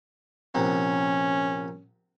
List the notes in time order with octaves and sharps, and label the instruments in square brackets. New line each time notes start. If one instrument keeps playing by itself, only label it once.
[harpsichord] A#1 C3 [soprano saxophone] C#4